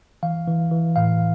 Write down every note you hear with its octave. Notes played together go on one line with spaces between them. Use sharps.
E3 F5
E3
E3
A2 F5